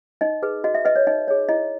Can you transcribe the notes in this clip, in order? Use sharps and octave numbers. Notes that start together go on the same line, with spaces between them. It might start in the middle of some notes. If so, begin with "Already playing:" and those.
D#4 D#5
G#4 B4
F#4 D#5
E5
B4 D#5
C#5
D#4 D#5
G#4 C#5
E4 D#5